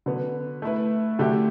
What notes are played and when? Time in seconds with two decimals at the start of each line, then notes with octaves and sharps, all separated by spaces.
0.06 D3 F#3 B3
0.62 A3 E4 B4
1.19 D3 F#3 A3 E4 G4